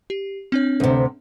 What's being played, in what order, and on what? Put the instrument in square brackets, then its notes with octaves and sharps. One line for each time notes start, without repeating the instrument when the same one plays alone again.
[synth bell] G4
C4 D4 C#5
[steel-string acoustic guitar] D2 C3